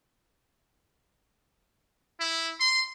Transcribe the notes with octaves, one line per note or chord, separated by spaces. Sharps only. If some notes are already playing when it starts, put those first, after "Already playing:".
E4
C6